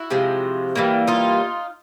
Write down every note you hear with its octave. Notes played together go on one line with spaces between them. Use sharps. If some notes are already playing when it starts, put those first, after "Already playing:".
Already playing: E4 F#4
C3 F3 G#3
E3 G3 A#3
D#4 F4